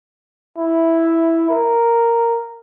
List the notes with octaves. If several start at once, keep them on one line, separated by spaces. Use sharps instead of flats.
E4
A#4